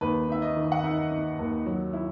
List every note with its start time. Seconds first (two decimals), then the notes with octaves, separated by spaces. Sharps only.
0.01 D#2 B4
0.28 D#4 E5
0.42 D#5
0.56 D#3
0.72 F#5
0.84 D#4 E5
1.12 D#4
1.39 D#2
1.66 F#3
1.93 E4